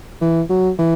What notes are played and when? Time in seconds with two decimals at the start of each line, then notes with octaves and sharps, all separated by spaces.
0.21 E3
0.50 F#3
0.79 E3